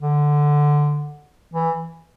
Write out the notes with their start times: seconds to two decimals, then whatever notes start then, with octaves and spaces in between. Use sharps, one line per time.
0.01 D3
1.53 E3